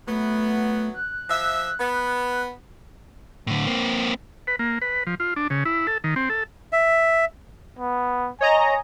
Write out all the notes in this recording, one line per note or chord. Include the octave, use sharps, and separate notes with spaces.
F#3 A3 B3
F#6
F3 E5
B3
A2 D3
A#3 C4
B4
A#3
B4
F3
F4
D4
C#3
E4
A4
D#3
C4
A4
E5
B3
C#5 D#5 G#5 A#5